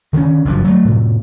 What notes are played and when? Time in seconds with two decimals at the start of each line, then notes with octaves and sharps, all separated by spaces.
0.13 D3 D#3 C4 C#4
0.45 F#1 G2 B2 F3
0.65 F#3 A3
0.85 A2 C3